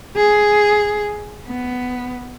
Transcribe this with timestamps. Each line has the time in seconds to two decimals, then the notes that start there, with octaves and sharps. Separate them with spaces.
0.16 G#4
1.47 B3